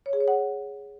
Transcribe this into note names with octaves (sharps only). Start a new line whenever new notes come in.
C#5
G#4
C#5
F#5